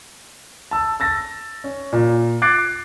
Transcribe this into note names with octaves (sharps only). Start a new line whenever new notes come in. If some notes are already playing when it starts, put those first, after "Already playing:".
A5 E6
E6 A6 A#6
C#4
A#2
D6 F#6 G#6 A6 C7 D7